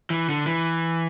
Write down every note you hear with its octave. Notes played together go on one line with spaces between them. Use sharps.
E3
D3
E3